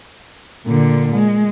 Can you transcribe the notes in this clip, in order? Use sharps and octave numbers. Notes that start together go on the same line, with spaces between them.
A#2 D3
G#3